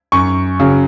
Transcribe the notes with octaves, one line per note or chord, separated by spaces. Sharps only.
F#2 C#6
C#3 F#3